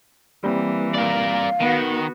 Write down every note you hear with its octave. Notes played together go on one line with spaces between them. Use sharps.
E3 G3 A#3 C4
A#4 D5 F5
D#3 B3 F#4